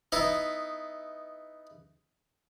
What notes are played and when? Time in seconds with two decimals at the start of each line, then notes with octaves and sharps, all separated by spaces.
0.12 B3 D#4 E4